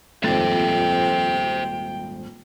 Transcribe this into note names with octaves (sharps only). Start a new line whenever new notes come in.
D#1 G#1 F2 C5 E5 G5 A6